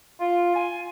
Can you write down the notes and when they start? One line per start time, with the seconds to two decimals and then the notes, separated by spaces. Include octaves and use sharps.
0.21 F4
0.56 G#5